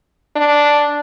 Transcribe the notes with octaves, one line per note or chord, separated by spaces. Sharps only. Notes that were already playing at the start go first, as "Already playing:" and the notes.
D4